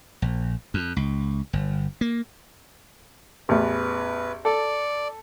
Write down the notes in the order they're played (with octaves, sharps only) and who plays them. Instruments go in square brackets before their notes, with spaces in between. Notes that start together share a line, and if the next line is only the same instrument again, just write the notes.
[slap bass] A#1
F2
C#2
G1
A#3
[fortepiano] A1 E2 [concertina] B4
[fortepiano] A4 [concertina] D5